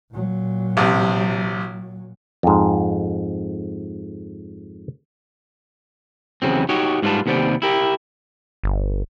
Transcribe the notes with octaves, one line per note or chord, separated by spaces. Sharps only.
A#2 F#3
A1 C3
F2 G#2
E2 G#2 C#3 F#3 C4
D#4 F#4 G4 C#5
G#2 G3 D#4 F4 B4 A5
D#2 C3 B3 C5 D5
E4 G4 A#4
G1